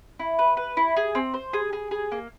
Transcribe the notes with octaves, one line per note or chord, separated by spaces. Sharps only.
E4
B4
B4
E4
G#4
C4
C5
G#4
G#4
G#4
A#3